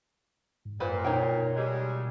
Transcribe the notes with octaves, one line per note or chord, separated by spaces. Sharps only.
G#2
F#2 A#2 B4 C5
B2 D#4 C#5 G5
G3 G#3